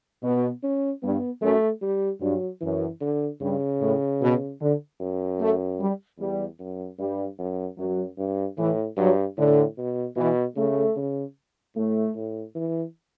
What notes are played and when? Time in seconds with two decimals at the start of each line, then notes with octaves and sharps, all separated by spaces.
0.23 B2 B3
0.63 C#4
1.03 G2 B3
1.42 F#2 A3
1.82 G3
2.21 G2 F#3
2.61 F#2 E3
3.01 D3
3.41 G2 C#3
3.81 A2
4.21 B2
4.60 D3
5.00 F#2
5.40 A3
5.80 G3
6.19 E2 G3
6.60 F#2
6.99 G2 G3
7.39 F#2
7.78 F#2 F#3
8.18 G2
8.58 A2 E3
8.97 G2 F#3
9.37 A2 D3
9.78 B2
10.17 B2 E3
10.56 C#3 A3
10.96 C#3
11.76 A2 A3
12.15 A2
12.55 E3